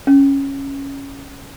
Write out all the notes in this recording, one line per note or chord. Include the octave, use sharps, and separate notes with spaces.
C#4